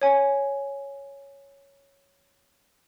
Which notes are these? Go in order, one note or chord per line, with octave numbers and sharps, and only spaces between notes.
C#5 G#5